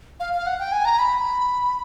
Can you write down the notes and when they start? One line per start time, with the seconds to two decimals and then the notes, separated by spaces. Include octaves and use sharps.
0.20 F5
0.34 F5
0.46 F#5
0.59 G5
0.72 G#5
0.85 A#5
0.99 B5